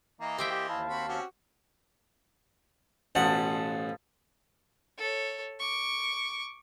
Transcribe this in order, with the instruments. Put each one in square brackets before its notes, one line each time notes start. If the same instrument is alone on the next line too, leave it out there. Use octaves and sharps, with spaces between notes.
[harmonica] E3 D#5 [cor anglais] A#3
[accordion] A#3 [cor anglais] G4 [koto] C5 E5 G5
[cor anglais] G4
[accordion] D#2 F5 A5 [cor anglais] E4
[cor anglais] C4 [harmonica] F#4 B5
[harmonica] C4 C#4 G4 [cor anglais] F#4
[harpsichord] A1 F#5 [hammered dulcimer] B2 F3 A5
[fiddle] A4 C#5
C#6 D6